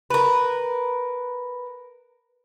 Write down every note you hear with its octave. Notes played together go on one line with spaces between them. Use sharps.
A#4 B4